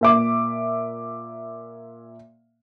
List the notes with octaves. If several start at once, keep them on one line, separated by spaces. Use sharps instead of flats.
A#2 E5 D6